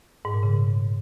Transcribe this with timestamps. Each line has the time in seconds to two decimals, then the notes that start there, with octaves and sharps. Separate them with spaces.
0.25 G#2
0.34 A#2
0.43 C#3